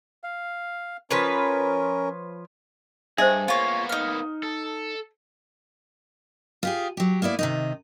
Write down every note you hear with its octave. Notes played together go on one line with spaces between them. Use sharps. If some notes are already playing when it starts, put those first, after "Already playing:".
F5
F3 C#4 A#4 B4 C#5
G2 G#4 C5 D#5 E5
A#3 B3 F4 C#5
D#4 F6
A4
F4 G4 G#4
F#3 G4
A#3 B3 E4 D5
C3 D#3 D#4